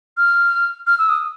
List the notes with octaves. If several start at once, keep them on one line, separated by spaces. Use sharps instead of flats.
F6
F6
E6
D#6